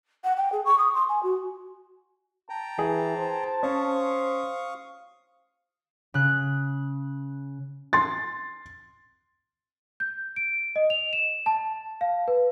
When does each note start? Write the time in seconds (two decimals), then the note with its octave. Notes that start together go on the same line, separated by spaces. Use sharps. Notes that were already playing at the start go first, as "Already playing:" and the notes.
0.24 F#5
0.36 G5
0.52 G#4
0.65 C#6
0.78 D#6
0.94 C6
1.09 G#5
1.23 F#4
2.49 G5 A5 A#5
2.79 E3 G#4
3.17 C5
3.63 C#4 F5 C#6 D#6
6.14 C#3 F#6
7.93 C6 A6
10.00 G6
10.36 D7
10.76 D#5
10.90 F7
11.13 E7
11.46 A5
12.01 F5
12.28 B4